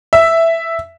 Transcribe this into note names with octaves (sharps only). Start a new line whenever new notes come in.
E5